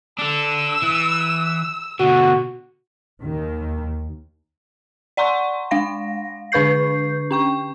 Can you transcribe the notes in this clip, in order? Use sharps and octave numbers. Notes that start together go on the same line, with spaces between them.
D4 A4 E6
E3
B2 D3 F#4
D#2 D#3
D5 F#5 A#5 C6 C#6
G#3 F5 A#6
D3 D4 B4 C#6 G6 C7
C#4 G5 C#6